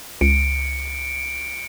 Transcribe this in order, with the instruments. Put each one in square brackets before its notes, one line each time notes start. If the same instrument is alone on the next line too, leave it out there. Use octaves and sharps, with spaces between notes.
[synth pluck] C#2 [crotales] C#7 D7